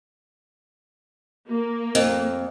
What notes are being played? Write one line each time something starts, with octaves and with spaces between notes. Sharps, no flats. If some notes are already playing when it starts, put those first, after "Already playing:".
A#3
F2